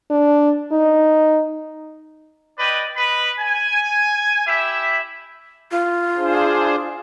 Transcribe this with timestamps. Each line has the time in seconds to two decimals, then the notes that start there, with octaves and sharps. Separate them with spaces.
0.11 D4
0.72 D#4
2.59 B4 D5 D#5 G5
2.96 B4 D#5 B5
3.40 G#5
4.47 E4 G4 E5
5.72 F4
6.16 D4 G#4 C5